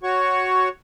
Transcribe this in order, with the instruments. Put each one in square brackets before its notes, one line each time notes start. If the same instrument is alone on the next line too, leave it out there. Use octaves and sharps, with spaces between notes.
[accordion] F#4 C#5 F#5 C#6